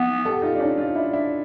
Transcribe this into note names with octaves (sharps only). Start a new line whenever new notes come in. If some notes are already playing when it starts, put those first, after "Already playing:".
Already playing: B3
G4 A4
D#4 F4
D4
C#4 D#4
D#4 F4
D4 E4
D4 E4